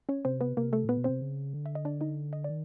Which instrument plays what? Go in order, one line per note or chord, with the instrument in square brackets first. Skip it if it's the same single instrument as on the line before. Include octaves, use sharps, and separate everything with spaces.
[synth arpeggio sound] C#4 C#5
[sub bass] C3 [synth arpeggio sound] C4 C5
[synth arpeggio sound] B3 B4
[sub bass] C3 [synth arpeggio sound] A#3 A#4
[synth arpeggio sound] A3 A4
[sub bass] A#2 [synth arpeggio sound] B3 B4
[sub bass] B2
[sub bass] C3 [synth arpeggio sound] C4 C5
[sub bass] C#3
D3
[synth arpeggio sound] E5
D#5
D4 D5
D#4 D#5
D#5
[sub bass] D#3 [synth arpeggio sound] D5